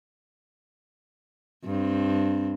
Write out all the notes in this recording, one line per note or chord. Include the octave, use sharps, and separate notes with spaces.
G2 C4